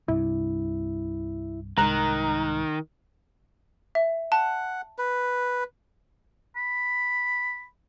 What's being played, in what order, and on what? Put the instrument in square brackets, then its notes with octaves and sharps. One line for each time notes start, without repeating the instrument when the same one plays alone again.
[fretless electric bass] C2 G2 C3 [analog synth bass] E4
[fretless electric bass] C2 [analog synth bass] G#2 [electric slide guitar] D#3 [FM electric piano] A#5 F#6
[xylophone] E5
[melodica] F#5 [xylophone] A5
[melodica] B4
[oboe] B5